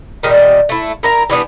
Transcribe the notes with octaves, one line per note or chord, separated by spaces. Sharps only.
A#2 D#3 G3
A3 E4
E4 A#4 A#5
E3 G3 B3 D4